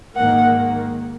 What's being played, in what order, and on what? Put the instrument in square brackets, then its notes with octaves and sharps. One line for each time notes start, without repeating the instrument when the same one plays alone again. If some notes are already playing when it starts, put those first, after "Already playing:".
[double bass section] G#2 D#3 A#3 [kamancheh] F#5